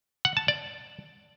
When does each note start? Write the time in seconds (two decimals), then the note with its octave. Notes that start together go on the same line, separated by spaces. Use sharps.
0.25 F#5
0.37 A5
0.48 D5